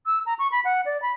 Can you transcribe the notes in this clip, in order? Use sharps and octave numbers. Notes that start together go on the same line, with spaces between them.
E6
A#5
C#6
B5
F#5
D5
B5